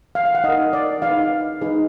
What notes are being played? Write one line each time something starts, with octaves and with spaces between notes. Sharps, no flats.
F5
F5
F#5
D#4 A#4 D#5
D5
D#4 G#4 B4 F5
D#4 G#4 B4